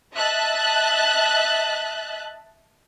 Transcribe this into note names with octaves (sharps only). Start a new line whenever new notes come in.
D#5 E5 A5 F#6